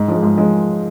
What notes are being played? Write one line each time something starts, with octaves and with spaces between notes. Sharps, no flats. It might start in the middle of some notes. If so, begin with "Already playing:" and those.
Already playing: G#2
F3 G#3
G#2
F3 G#3